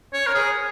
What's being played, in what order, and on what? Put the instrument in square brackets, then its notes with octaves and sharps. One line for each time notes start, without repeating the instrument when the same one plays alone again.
[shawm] C#5
A#4
G#4